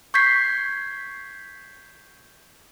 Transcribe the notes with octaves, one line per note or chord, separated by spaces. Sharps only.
C#6 G6 G#6 B6 C7